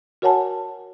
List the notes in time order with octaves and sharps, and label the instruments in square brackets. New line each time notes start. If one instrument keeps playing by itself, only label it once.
[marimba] F#4 A#4 C#5 F#5 G#5 A5